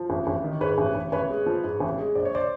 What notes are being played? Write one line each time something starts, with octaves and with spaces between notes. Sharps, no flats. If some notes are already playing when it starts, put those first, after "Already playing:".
Already playing: F3
A1
A1
D#3
G#2 B4 C#5
A1
A1
A1 B4 C#5
G#3
F3
G#2
A1
G#3
A#1 D5
C#5
C5 D5